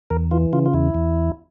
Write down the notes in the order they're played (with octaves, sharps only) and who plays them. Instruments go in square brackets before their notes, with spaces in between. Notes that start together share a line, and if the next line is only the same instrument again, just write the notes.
[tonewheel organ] E2 A#4
E3 F4
C#3 F4
F4
E2 E4
E2